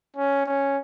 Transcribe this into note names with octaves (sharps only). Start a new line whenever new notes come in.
C#4
C#4